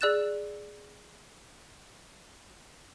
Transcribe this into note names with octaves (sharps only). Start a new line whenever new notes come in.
G#4 D5 E6 F#6 A6 E7